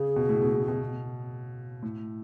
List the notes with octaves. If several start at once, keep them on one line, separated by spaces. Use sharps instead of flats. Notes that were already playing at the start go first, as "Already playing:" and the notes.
Already playing: C#3 G#4
B2
A2
B2
A2
B2
A2